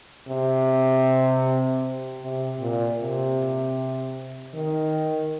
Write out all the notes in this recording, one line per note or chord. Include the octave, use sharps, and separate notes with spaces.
C3
C3
A#2
C3
D#3